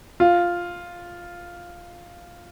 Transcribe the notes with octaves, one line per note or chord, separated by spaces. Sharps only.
F4